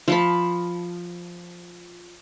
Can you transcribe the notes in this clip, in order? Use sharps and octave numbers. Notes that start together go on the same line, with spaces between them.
F3 A5 B5